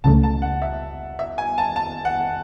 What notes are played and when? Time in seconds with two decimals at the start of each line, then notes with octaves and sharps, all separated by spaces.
0.04 C#2 C#3 E3 A3 A5
0.23 A5
0.42 F#5
0.62 E5
1.19 E5
1.38 G#5
1.58 A5
1.76 A5
2.05 F#5